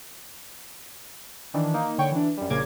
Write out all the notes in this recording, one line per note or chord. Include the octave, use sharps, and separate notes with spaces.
D#3 E3 D4
A#3 D#4
D3 C#5 G5 C#6
E3 D4
F#2 G3
A#1 A#2 C#3 A#3 D6 G#6